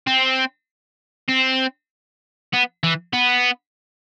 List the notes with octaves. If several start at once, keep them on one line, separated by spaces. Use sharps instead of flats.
C4
C4
B3
E3
B3